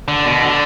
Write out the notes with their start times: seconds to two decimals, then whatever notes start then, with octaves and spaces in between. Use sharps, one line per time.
0.08 D3
0.25 B2
0.42 D3